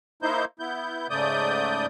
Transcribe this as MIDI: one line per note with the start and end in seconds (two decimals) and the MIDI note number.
0.23 0.45 58
0.23 0.45 63
0.23 0.45 64
0.23 0.45 72
0.23 0.45 91
0.59 1.07 59
0.59 1.07 64
0.59 1.07 91
1.10 1.86 44
1.10 1.86 49
1.10 1.86 57
1.10 1.86 74
1.10 1.86 87
1.10 1.86 91